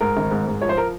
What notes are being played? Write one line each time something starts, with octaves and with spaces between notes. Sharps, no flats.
G#2 A#4
G#1
G#2
G#2
F3 C#5
C5
A#4